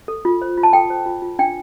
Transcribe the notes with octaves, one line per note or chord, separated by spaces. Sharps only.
A4
F4
C5
F4
A5
A4 G5
C5
F4
F4
D4 G5